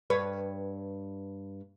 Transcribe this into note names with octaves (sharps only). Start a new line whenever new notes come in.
G2 B4 C#5